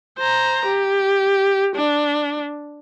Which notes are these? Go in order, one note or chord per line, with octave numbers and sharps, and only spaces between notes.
C5 A#5
G4
D4